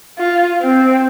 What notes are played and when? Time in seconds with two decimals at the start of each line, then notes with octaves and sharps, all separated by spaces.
0.18 F4
0.62 C4